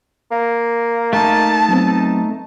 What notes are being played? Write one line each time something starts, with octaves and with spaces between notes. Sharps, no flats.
A#3
A3 D#4 A5
F#3 B3 C4